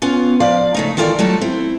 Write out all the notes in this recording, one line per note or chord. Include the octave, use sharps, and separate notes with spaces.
B3 C#4 F4
F3 D5 F5
C#3 A3 D#4
D#3 E3 F4 A4 B4 D5
F#3 G3 A3 D#4 F4 A4
C4 E4